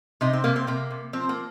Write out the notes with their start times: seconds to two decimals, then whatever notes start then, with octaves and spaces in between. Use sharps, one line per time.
0.21 C3 D#4
0.33 C4
0.44 C3 A#3
0.56 C4
0.67 C3 A#3
0.91 C3
1.13 F3 C4
1.29 A#3